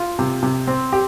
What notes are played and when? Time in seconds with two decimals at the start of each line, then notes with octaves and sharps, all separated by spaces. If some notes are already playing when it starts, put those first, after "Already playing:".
Already playing: F4
0.19 C3
0.43 C3
0.67 C4
0.93 G4